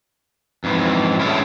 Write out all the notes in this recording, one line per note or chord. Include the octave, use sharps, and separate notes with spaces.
F2 G#2 E3
D3 G#3 A3 B3 C#4 E4